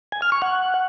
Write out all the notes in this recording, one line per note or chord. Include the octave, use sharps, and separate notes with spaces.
G#5
F6
C#6
F#5